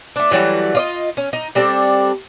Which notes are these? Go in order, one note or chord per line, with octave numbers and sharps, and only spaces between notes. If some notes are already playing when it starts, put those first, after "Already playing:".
A3 D4
E3 F#3 G3 A3
F4 D5 D#5
C#4
D#4
G3 C4 D4 A4